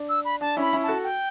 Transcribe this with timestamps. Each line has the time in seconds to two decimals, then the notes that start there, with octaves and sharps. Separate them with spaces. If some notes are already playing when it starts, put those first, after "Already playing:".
Already playing: D4
0.09 E6
0.25 B5
0.41 D4 A5
0.57 C#4 E4 B5
0.73 C#4 E4
0.83 F#4 A4 A5
1.03 G5